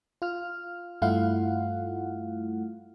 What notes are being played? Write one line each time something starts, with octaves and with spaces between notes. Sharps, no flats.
F4 F6
G2 A3 E4 F4 F5 F#5